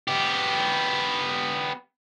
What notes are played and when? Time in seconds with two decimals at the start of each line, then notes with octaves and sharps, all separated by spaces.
0.08 B3 G4